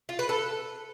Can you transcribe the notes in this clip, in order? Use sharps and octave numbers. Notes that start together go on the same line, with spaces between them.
F4
B4
A4